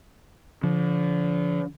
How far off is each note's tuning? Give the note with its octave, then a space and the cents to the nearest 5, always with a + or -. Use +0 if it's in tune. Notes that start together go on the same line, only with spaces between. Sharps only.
D3 -35 F3 -15